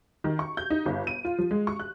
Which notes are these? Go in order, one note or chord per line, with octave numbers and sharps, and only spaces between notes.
D#3
C#6
G6
D#4
G1
D#7
F4
F3
G#3
C#6
F#6